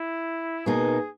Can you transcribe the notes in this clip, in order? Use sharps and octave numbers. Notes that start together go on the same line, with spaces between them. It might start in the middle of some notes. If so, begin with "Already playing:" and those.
Already playing: E4
B2 A#3 D#4 G#4